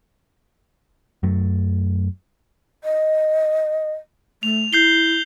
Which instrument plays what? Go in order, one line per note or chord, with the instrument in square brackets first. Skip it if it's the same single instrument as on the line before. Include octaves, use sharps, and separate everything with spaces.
[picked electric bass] F#2 F#3 A3
[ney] D#5
[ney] A3 [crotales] F7
[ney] E4 [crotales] G6 C7 G7